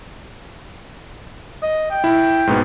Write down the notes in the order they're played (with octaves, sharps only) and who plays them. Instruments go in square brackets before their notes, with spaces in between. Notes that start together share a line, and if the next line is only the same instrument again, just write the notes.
[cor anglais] D#5
G5
[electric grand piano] E4
G#2 B2 B3